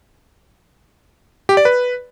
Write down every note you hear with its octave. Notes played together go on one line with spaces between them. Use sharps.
G4
D5
B4